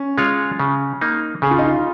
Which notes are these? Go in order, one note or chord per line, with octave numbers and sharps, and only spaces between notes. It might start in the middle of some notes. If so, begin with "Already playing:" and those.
Already playing: C#4
G#3 F4 C#5
C#3
A#3 D#4
C#3 G#4
F4
D#4
F4